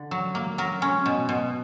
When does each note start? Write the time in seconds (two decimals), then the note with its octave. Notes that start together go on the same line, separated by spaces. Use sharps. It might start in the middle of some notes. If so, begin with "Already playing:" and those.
Already playing: D3
0.11 F#3
0.35 A#3
0.58 F#3 A#4
0.82 C#4
1.06 B2
1.29 B2